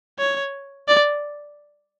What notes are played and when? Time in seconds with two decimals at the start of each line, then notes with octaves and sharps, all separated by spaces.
0.19 C#5
0.88 D5